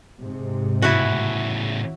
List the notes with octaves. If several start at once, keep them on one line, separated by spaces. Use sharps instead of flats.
G#2 C3
A2 C#3 E4 F#4